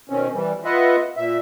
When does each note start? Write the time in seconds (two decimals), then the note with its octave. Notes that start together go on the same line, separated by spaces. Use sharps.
0.10 B2 D#3 C4 C#4
0.34 E3 G3
0.65 F4 B4 D#5 E5 F#5
1.17 A#2 E5